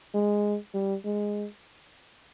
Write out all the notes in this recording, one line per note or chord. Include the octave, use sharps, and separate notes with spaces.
G#3
G3
G#3